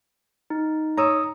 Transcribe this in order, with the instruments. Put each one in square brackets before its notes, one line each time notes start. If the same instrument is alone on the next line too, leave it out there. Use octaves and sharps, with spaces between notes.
[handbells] D#4
[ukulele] C#5 [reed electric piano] A#5 D#6 E6